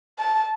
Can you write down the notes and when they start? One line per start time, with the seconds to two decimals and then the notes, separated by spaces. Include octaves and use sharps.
0.19 A5